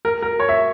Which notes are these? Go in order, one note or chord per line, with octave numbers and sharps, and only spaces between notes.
A#4
A#4
C#5
E5